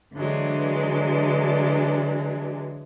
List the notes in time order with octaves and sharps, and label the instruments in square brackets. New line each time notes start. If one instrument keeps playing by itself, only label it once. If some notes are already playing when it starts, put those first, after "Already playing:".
[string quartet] D3 E3 F#3 G#3 D4